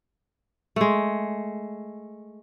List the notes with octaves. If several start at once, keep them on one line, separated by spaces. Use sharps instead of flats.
G#3 A3